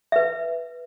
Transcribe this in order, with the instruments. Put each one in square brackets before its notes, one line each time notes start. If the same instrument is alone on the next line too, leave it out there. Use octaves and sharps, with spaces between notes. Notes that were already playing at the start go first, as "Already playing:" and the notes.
[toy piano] B4 E5